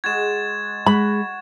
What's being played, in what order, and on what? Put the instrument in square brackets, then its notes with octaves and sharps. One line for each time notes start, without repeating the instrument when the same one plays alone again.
[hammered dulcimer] G#3 F#4 [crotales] G#6 A6 E7
[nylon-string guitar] G#3 [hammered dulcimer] F#4 [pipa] B5